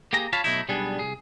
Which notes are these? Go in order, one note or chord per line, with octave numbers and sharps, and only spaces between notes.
A#3 G4 G#4 A#5
F4 C#5 F5 A5 B5
B2 F#3 A3 D#4 E4
B1 G3 B3 D4 G#4
C2 B2 G#4